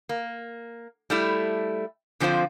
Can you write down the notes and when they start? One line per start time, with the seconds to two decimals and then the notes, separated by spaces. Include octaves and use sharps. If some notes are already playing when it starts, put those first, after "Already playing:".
0.09 A#3
1.10 G3 A3 E4
2.20 D3 F3 C4 F4 C5